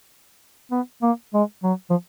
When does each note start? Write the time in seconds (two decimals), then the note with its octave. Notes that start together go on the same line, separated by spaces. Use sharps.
0.71 B3
1.02 A#3
1.33 G#3
1.63 F#3
1.90 F3